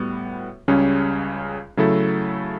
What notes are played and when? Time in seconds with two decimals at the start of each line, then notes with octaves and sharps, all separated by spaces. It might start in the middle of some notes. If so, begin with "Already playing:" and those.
Already playing: A2 G3 B3 F#4
0.68 C#2 C#3 G3 C#4
1.77 C#3 F#3 A3 E4 A4